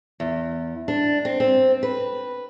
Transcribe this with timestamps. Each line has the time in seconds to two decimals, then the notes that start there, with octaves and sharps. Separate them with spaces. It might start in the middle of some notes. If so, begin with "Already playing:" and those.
0.20 E2
0.88 D4
1.25 C4
1.40 C4
1.83 B4